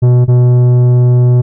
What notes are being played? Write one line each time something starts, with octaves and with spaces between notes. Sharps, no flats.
B2
B2